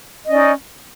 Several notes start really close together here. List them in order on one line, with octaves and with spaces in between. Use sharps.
D#5 C#4 D5 D#4